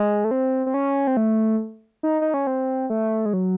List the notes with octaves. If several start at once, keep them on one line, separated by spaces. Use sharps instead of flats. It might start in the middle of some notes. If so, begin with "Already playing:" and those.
Already playing: G#3
A3
C4
C4
C#4
C4
A3
D#4
D#4
C#4
C4
A3
G#3
F#3